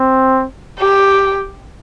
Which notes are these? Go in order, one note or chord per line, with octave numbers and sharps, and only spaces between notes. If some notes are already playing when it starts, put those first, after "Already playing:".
Already playing: C4
G4